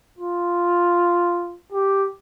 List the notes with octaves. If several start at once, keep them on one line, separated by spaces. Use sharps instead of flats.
F4
G4